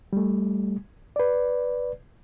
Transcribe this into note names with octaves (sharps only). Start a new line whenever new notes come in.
G3 A3
B4 D5